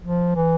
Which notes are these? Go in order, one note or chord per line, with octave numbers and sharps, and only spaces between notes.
F3
E3